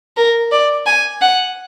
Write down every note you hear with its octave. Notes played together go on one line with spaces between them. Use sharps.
A#4
D5
G#5
F#5